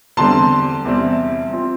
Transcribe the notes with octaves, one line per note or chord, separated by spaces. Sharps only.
E2 D3 G3 C4 A5 C6
E2 C3 G3 C4
F3 C4